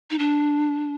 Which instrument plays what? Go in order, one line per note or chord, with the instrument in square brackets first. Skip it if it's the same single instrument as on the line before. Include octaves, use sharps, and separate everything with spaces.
[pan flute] D#4
D4